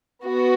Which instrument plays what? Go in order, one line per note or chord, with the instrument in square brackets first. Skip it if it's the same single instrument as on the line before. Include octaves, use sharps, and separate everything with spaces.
[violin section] B3 F#4